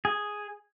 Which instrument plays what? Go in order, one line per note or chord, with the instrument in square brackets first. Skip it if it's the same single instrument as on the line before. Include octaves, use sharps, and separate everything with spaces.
[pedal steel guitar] G#4